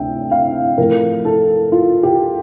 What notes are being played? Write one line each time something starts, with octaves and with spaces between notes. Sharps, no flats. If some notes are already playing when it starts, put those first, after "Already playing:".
Already playing: D2 C3 E5 G5
F5
A2 F3 A3 A#4
A4
F4
G4